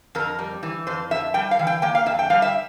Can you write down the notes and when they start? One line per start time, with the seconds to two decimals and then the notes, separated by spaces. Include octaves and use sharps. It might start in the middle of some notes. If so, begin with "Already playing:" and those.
0.15 F2 A#4
0.39 G3
0.63 E3
0.87 F2 C5
1.11 F2 E5
1.34 G3 G5
1.51 F5
1.59 E3
1.67 G5
1.82 A#3 G5
1.95 F5
2.06 F2 E5
2.19 G5
2.30 G3 F5
2.42 E5